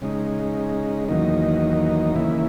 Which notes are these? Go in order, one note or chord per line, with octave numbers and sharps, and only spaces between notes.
C#3 G#3 D#4
E2 D#3 F#3 A#3 D#4
D#2 C#3 E3 A#3 E4